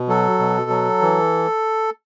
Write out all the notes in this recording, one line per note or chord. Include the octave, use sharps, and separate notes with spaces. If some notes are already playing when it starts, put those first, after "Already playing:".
Already playing: B2
F#3 A4
B2
F#3
E3